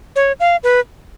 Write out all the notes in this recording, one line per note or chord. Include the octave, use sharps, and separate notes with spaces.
C#5
F5
B4